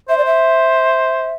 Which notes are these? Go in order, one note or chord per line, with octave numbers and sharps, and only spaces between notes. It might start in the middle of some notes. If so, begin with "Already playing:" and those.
C5 E5
D5
E5